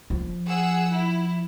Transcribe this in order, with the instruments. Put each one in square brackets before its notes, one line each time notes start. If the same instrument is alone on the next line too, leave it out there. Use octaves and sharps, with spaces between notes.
[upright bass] F3
[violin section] G#4 F#5 E6
E4